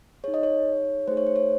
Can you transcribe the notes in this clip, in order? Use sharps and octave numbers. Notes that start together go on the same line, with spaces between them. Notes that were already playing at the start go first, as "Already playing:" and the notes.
D#4 G#4 C#5
D#5
C#5
A3 D#4 G#4 C5
C#5
C5
C#5